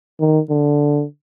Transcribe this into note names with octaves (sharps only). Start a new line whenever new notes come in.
D#3
D3